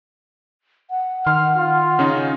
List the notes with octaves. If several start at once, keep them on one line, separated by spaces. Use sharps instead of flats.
F#5
D#3 C6 F6
F4
C#3 C#4 D#4